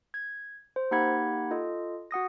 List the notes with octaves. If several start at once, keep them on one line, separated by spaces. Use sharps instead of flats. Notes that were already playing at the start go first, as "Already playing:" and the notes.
G#6
C5
A#3 D#4 G4 F#5 B5 G#6
F4 A4 D#5
F#4 F#5 D#6 A#6